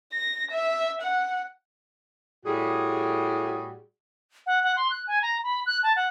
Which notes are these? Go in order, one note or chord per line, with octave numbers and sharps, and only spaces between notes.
A#6
E5
F#5
A2 G3 F#4 G#4
F#5
F#5
C6
F#6
G#5
A#5
B5
F#6
A5
F#5